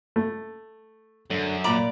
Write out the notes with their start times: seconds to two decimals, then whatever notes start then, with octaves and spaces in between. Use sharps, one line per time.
0.16 A3
1.30 F#2 D3
1.64 A#2 F4 D5 A#5 B5